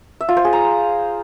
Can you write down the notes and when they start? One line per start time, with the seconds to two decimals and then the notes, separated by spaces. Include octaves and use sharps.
0.21 E5
0.29 F4
0.37 C5
0.45 G#4
0.53 A#5